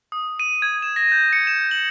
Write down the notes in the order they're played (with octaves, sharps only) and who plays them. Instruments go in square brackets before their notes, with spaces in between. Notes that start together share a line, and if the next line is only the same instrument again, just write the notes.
[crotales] D#6
D#7
G#6
E7
A#6
G6
C#7
E7
F#7